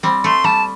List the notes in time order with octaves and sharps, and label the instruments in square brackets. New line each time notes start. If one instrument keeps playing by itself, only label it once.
[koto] G3 C4
[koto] A3 [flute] C6
[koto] G3 [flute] A5